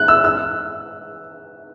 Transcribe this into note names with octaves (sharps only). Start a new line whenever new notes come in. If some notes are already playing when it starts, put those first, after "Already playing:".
Already playing: F#6
E6
E6